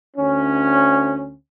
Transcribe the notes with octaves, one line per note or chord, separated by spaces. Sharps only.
D2 C#4